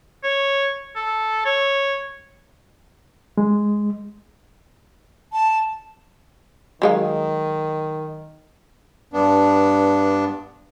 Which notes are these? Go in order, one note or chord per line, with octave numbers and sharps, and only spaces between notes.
C#5
A4
C#5
G#3
A5
D#3 F#3 G#3 F5
G2 B3 D4